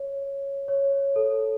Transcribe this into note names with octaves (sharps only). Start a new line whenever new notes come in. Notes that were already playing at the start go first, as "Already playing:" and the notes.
Already playing: C#5
C#5
A4